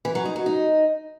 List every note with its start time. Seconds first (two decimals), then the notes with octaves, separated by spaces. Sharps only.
0.05 E3
0.15 F#3
0.25 D#4
0.36 F#3
0.46 D#4